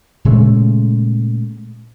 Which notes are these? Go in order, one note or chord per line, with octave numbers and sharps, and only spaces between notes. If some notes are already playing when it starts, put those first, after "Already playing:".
A#2 C#3 G#3 A3